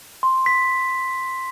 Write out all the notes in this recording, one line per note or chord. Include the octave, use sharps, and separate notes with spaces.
C6
B6